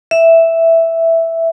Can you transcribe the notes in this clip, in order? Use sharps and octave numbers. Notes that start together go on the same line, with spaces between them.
E5